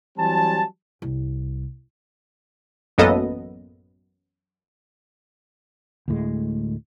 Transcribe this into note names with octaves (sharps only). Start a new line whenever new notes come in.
E3 F#3 G3 C4 G#5 A5
C2
A1 F#2 A#3 B3 A4 D#5
D2 A2 G#3